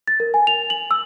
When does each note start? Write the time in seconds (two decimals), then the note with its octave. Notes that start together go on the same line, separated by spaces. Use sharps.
0.08 A6
0.20 A#4
0.34 G#5
0.47 F7
0.70 F#7
0.91 E6